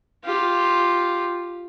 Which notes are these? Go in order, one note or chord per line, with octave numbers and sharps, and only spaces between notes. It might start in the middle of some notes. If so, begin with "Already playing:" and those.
F4 G4